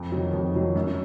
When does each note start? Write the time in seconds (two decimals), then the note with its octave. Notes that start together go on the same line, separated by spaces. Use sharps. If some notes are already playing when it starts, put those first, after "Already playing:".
Already playing: F2
0.12 D#3 F#3
0.33 F2
0.54 D#3 F#3
0.75 F#2